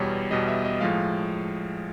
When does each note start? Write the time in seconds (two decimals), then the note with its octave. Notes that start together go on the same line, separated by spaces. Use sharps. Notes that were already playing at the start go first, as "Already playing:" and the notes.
Already playing: E2 B2 G3 C#5
0.31 E2 B2 G3 D#5
0.48 E5
0.65 D#5
0.81 A2 F3 G#3 F5